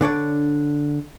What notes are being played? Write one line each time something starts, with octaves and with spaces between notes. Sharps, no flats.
D3 D4 C#5 D5